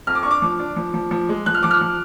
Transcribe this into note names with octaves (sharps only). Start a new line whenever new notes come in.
F2 F6
D6
D4 C#6
D6
F3
D4
F3
F3
F3
G#3
F3 F#6
F6
F3 D6
F6
F3